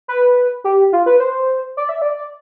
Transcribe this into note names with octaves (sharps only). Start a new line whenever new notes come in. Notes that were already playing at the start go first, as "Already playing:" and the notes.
B4
G4
F4
B4
C5
D5
E5
D5